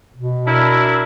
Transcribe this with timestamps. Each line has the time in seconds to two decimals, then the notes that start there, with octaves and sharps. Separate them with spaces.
0.16 B2
0.47 D4 E4 A#4